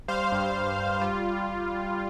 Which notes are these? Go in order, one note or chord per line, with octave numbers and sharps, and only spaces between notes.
G3 C5 F5
G2
G2
G2
G3 F4